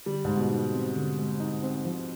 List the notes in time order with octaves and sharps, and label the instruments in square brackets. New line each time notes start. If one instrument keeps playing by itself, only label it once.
[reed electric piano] D3 [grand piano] G3
[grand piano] G#2 [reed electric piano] G#3
[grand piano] B2
[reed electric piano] D#4
C4
D3
G#3
D#4
C4
F3